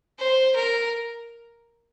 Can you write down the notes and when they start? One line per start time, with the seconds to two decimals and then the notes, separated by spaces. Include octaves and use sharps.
0.19 C5
0.55 A#4